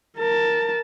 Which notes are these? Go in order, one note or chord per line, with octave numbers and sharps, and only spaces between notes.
A#4 A5